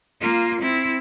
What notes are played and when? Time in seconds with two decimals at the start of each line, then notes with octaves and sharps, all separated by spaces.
0.21 A#3 F4
0.61 C4 E4